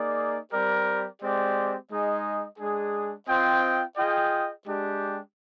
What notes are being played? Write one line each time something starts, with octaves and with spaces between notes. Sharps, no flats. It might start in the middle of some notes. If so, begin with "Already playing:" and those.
Already playing: A#3 D#4 G#4 D5
G3 C4 G4 A#4 D5
G#3 C4 G4 D5
G#3 D#4 G#4 D#5
G#3 D4 G#4
C4 F4 C5 D#5 G5
F4 G#4 D#5 G5
G#3 D4 G4